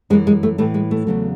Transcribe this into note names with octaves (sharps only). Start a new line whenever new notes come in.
F#2 E3 G#3
G#3
A3
A2 E3 A3
G#3
A3
E2 C#3 F#3